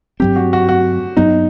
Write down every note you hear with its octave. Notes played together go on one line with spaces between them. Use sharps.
G2 F#3 C4 G4
F#4
F#4
F#4
G2 F#3 B3 D#4